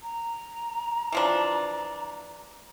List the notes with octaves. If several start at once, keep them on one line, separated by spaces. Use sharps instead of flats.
A#5
E3 F3 D4